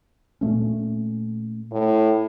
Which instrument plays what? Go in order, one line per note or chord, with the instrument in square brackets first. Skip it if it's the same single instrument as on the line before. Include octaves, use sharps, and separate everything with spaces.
[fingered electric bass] A#2 A3 C#4
[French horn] A2